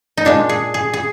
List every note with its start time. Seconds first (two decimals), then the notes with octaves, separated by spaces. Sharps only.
0.17 D#4
0.25 A#2 G#3 D4
0.49 G#4
0.74 G#4
0.93 G#4